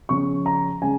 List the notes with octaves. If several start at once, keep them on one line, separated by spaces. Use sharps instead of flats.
C#3 F3 C#4 C#6
A#5
C#3 G#3 C#4 G#5